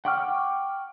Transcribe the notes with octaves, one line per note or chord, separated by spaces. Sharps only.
F#5 G5 C#6 D6 F6